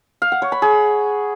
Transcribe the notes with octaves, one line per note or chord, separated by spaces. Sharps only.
F5
F#5
C#5
B5
G#4